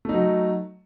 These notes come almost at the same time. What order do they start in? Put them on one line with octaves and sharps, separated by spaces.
A3 D#4 F#3